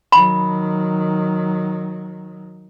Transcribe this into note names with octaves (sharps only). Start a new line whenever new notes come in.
D#3 F#3 B5